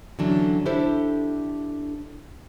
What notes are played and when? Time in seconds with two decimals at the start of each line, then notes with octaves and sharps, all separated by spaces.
0.19 D3 E3 F#3 C#4 D4
0.66 D4 E4 G4 A4 C5